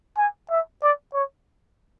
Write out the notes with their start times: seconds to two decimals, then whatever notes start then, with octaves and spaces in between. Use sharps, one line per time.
0.18 G#5
0.50 E5
0.82 D5
1.13 C#5